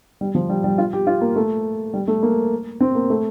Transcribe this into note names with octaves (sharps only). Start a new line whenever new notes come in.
G3
F3
G3
G3
F4
G4
F4
A#3
A3
G3
A3
A#3
C4
A#3
A3